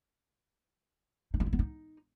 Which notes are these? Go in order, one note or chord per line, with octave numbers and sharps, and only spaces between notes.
D#4
F4
E4
B3
D#4